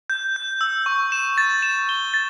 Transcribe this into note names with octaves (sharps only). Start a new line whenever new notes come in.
G6
G6
E6
C#6
E7
A6
E7
G7
A6